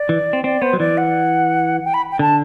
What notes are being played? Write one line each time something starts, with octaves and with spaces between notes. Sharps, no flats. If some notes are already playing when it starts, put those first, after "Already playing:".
Already playing: D5
E3
C4
C4 D5
B3 C5
F#3
E3 D5
F#5
G5
B5
G5
D3 A5